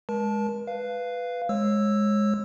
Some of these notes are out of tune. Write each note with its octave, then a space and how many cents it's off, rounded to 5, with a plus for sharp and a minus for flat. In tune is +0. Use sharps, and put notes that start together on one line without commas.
G#3 +0 A#4 +40 A5 -10
B4 +5 F5 -10
G#3 +0 C#5 -25 E6 +0